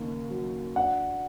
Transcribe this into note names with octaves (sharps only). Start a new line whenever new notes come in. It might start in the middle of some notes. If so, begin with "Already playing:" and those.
Already playing: D#2 C#3 A#3
F#3
D4 F#5